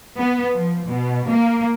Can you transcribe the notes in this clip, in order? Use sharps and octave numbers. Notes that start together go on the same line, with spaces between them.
B3
F3
B2
A#3